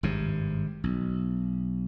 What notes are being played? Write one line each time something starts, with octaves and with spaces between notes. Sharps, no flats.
G#1 G2 C3
B1